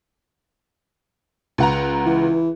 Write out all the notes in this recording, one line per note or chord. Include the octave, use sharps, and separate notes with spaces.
C#2 F#5 A#5
E3